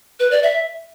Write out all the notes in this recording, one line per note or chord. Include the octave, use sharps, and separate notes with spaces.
B4
D5
E5